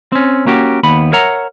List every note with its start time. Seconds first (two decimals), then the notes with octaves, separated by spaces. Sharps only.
0.12 C4 C#4
0.46 A#3 C#4 F#4 G4
0.83 D#2 B3 B5
1.13 A#4 C#5 E5 F#5 A#5